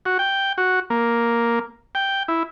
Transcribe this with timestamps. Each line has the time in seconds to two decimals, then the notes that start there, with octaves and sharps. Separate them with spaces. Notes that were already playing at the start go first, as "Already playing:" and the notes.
0.05 F#4
0.19 G5
0.58 F#4
0.90 A#3
1.95 G5
2.28 E4